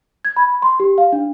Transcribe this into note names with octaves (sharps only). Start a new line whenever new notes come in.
G#6
B5
C6
G4
F5
D4